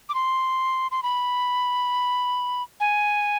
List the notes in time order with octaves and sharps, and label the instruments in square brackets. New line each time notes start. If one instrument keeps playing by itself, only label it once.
[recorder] D6
C6
C6
B5
G#5